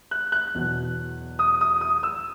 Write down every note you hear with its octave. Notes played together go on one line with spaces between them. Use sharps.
F#6
F#6
E2 B2 F#3
D#6
D#6
D#6
E6